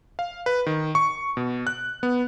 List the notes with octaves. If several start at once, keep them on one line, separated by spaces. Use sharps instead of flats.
F5
B4
D#3
C#6
B2
F#6
B3